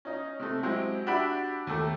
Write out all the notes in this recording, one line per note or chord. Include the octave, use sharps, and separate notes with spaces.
C#4 D#4
C3 A3
F#3 G#3 C4 E4 G4
D4 F#4 G4 E5 B5
D#2 A3